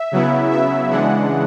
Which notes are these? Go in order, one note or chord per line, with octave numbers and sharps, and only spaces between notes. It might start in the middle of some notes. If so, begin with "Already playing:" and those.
Already playing: E5
C#3 F#3 B3 E4
E5
C#3 E3 G#3 D4 F#5